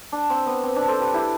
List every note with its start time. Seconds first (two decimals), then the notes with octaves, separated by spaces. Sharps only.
0.12 D4
0.30 C4
0.46 B3
0.63 C4
0.76 D4
0.88 A4 C5
1.01 G4 B4
1.14 E4 G4